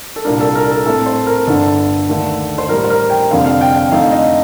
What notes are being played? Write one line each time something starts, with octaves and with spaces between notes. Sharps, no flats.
A4
C2 A#2 G3 D4 A#4
A4
A#4
A4
A2 A3 C4 A4
C5
A#4
G1 G2 D3 A4
D#2 D3 A3 D4
C5
A1 A2 G3 A#4
C5
A#4
G5
F1 F2 D3 G3 C4 F5
F5
G5
F5
G5
F2 D3 A3 D#4 F5
D#5